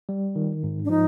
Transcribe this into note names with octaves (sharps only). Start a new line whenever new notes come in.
G3
D#3
G#2
D4
F3 D#4